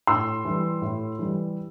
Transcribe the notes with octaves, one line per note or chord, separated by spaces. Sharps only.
A2 C6 E6
E3 G3
A2
E3 G3